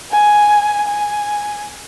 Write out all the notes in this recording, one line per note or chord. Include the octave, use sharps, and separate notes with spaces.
G#5
G#5